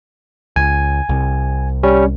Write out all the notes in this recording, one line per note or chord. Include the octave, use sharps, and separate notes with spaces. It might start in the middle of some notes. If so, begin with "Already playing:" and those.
C#2 G#5
C2
G3 C#4